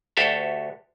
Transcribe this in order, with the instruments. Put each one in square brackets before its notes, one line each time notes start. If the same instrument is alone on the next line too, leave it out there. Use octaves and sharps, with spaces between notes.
[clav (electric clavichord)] D2 F#4 G4 A4 E5 F5